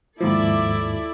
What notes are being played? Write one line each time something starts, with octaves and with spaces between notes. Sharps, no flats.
D#2 G#2 F3 E4 A4 D5